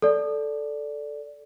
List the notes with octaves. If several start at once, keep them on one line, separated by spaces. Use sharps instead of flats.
A4 D5